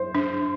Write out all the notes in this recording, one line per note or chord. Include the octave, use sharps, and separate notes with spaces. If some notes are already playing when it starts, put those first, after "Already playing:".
Already playing: C5
D4